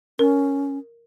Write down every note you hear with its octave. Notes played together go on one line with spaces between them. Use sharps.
C#4 A#4